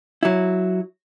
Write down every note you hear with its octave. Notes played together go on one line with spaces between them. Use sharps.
F#3 E4